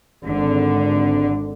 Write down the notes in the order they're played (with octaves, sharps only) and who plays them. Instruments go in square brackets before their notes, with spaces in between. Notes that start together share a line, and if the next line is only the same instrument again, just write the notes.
[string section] G#1 D3